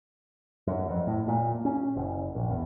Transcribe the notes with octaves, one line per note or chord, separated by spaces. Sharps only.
F#2
F2
A2
A#2
C#4
F#1
A#1
E2